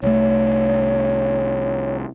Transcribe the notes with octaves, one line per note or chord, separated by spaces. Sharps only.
C2 A3 C#5